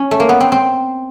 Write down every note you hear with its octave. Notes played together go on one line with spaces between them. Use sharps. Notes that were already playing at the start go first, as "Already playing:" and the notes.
Already playing: C#4
A3
A#3
B3
C4
C4